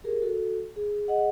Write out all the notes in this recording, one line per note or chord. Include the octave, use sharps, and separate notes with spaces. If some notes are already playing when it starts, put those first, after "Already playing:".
G4 G#4 A#4
F#4 A4
G#4
G#4 D#5 F#5